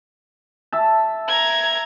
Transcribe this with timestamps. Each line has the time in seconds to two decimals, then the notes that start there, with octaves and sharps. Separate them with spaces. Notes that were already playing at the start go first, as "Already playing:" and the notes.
0.72 E5 A5
1.28 A#5 G#6